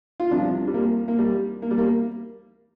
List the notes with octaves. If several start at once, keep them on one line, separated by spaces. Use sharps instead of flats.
F4
C2 C3 F3 D4
G3
A#3
A#3
G3
A#3
G3
A#3